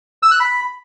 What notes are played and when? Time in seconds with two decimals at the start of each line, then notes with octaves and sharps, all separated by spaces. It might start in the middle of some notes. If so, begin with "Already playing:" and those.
0.23 E6
0.31 F#6
0.40 B5